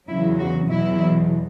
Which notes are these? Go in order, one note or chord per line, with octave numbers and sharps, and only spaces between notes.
E2 C#3 F#3 E4
F#4
E2 B2 F#3 E4